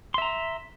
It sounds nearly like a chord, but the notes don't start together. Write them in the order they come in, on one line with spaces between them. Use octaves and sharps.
C6 E5 A#5